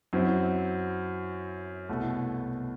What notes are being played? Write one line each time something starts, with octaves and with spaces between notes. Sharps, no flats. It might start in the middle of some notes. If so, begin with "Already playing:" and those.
F#2 F#3 C4 E4
C2 B2 A3 E4